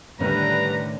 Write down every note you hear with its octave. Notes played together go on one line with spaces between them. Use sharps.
A2 D3 D#3 G3 C#4 B4 A#5